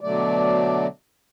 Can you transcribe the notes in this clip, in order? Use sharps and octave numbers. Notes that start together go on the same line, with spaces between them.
B2 D3 F#3 A3 D5